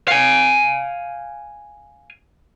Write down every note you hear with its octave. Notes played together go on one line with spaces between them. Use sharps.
F5 G#5